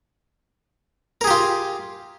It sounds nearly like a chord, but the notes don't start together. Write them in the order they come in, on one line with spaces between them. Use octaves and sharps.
A#4 G#4 G4 F4